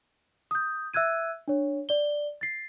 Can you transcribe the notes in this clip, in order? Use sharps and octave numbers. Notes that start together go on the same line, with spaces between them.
D#6 G6
E5 E6 F#6 G#6 D#7
D4 C#5
D5 G7
A6 C7